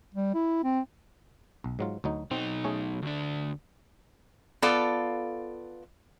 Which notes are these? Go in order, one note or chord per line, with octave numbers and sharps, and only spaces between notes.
G3
E4
C4
B1
G#2 F#3 F4
D2 F#3 D#4
B1 C4 D#4
A3 C#4 G#4
D2 D4
B3 F4 A4 D5 F5